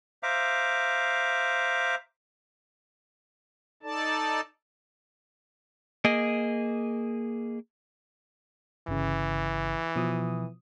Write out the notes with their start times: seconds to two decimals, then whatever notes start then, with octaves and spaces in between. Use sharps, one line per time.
0.23 C5 E5 F5 A#5 D6
3.83 D#4 A4 D5 A5
6.05 A#3 G#4 D#5
8.88 G1 C#3 E3
9.96 B2 F3 D#6